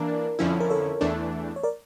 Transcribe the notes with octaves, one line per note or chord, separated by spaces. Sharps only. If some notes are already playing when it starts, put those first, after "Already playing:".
Already playing: E3 A#3 D4 A#4 D5
F2 D3 F3 C#4 E4
A#4
A4 C#5
E2 E3 A3 D4
C#5
A#4 D5